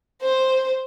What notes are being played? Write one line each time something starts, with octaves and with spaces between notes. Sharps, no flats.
C5